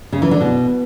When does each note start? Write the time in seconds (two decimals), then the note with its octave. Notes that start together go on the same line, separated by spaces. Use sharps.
0.12 C#3
0.22 E3
0.31 D3
0.41 B2